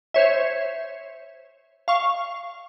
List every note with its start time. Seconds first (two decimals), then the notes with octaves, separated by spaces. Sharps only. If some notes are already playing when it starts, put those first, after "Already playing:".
0.14 C5 C#5 E5
1.88 F5 C#6